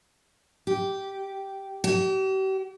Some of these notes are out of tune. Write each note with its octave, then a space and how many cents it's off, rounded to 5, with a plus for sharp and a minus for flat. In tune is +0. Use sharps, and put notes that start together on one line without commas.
G4 -10
G4 -40